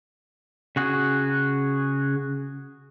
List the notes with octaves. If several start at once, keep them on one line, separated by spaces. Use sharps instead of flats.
C#3 F#4 G#4